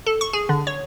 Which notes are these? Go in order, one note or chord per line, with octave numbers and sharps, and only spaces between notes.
A4
C#6
G#4
D3
C#5